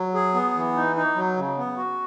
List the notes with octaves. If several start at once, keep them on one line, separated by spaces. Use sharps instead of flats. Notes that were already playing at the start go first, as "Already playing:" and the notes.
Already playing: F#3
G#4
B3
E3
D#4
D#4
F#3
C#3
B3
F#4